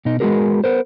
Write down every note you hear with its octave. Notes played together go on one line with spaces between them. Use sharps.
B2 D#4
G#3 B3 C4 F#4 G#4 A#4
B3 A#4 C5